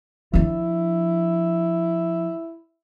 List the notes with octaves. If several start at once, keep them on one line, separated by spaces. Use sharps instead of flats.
F3 D4 E4